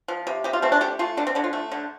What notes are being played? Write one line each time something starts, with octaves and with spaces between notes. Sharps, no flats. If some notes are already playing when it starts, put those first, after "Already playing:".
F3
C3
C3 G4
F4
A3 C4
D4
A3 G4
A3 F4
D3 D4
C4
D3 D4
F4
A3
D3